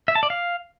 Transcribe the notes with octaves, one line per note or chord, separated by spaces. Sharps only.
E5
A5
D5
F5